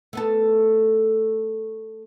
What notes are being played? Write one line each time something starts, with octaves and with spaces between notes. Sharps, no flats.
A3 B3 A4